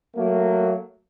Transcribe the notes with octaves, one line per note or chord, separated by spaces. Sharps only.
F#3 A3 A#3